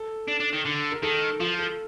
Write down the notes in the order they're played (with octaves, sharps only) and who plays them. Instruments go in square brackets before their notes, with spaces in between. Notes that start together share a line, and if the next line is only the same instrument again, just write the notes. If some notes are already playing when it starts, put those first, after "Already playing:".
Already playing: [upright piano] A4
[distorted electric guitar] D4
D4
D#3
D3
[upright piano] A#4
[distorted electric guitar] D#3 [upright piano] A4
[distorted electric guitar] F3 [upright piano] F4
[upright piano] A4